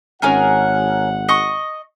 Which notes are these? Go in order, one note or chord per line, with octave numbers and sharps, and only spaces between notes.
G#1 C#4 G#4 A#4 F#5
D#5 C#6